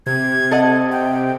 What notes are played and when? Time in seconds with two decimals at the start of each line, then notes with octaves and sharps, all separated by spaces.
0.06 C3 G#6
0.51 A4 D#5 F#5
0.92 G5